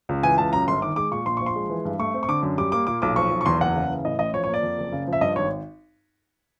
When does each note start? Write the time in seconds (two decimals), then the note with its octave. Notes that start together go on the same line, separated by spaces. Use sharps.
0.09 C#2
0.23 E3 G#5
0.38 C#2 A5
0.53 F#2 A#5
0.68 G1 C6
0.82 D#3 D6
0.96 G#3 D6
1.11 A#2 C#6
1.26 A#1 C6
1.37 F3 C#6
1.46 C6
1.56 G#3
1.70 E3
1.85 G2
1.99 A3 C#6
2.14 C4
2.23 C#6
2.28 D3 D6
2.43 F#2
2.58 G3 D6
2.72 A#3 D6
2.87 A#2 D6
3.02 B1 D6
3.16 F3 C#6
3.31 B1
3.41 C#6
3.46 E2 C6
3.60 F#1 F#5
3.75 C#3
3.90 E3
4.05 A2 D#5
4.19 A1 D#5
4.34 F3 C#5
4.44 C#5
4.48 A#3
4.54 D5
4.63 F2
4.78 F#1
4.92 C#3
5.07 F3
5.13 E5
5.21 G2 D#5
5.36 G#1 C#5